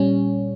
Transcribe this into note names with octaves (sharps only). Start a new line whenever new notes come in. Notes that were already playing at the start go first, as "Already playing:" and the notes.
Already playing: A#2 G3 C#4